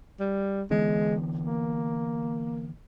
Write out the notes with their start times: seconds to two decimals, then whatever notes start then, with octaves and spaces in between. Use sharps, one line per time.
0.20 G3
0.70 D3 E3 G#3 B3
1.45 A#3